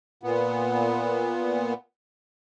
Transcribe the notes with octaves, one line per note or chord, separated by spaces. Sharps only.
A#2 B3